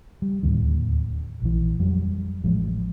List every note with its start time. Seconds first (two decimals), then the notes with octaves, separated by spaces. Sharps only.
0.22 G3
0.43 D1 G#1 D#2 D3
1.42 A#1 E3
1.79 F2 F#3 G3
2.44 A1 F3 G#3